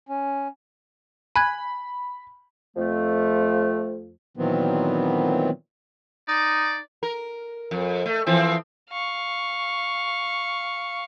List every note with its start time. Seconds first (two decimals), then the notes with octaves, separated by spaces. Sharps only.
0.09 C#4
1.36 G#5 B5 F#6 G#6
2.76 F2 F3 A3
4.37 A#2 D#3 E3 F#3 B3 C4
6.28 D#4 D5
7.03 A#4
7.71 F2
8.06 A3
8.26 E3 F3 C4
8.91 F5 C#6